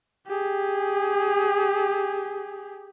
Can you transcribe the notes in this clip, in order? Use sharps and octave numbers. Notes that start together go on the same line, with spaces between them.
G4 G#4